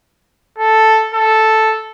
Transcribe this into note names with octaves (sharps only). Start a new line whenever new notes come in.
A4
A4